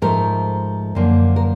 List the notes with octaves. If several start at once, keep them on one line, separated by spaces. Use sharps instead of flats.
G#2 F3 A3 A#4
F#2 D3 F3 A#3
A#4